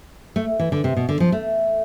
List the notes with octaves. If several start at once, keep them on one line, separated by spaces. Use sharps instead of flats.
A3
E3
D3
C3
B2
D3
F3
A3